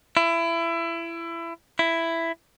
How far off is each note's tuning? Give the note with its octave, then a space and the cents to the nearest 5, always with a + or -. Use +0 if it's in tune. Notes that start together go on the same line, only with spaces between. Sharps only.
E4 +25
E4 +10